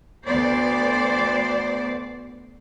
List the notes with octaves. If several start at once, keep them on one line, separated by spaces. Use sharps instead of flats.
D2 B3 C5 D5